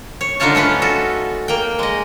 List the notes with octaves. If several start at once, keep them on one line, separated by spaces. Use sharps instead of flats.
C#5
D3 D4 D#4 F4 C#5 A5
A3 C#4 F4 B4
F#4 A4
A#3 G5
G#3 D#5